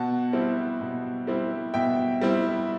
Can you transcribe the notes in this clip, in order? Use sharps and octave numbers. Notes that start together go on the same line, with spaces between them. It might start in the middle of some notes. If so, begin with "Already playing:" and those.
Already playing: B2 F#5 A5
G3 C4 E4
B2
G3 C4 E4
B2 E5 G5
G3 C4 E4